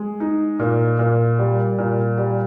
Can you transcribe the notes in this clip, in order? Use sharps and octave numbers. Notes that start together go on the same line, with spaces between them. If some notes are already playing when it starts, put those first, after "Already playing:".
Already playing: G#3
D#4
A#2
A#2
G3
A#2
G3